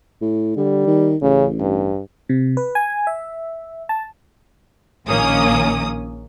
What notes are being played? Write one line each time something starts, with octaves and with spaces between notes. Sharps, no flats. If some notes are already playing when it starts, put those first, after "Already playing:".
A2
D3 G3
D#3
A1 C#3
G2
C3
B4
G#5
E5
A5
A#1 D#3 A#3 C#4 D#6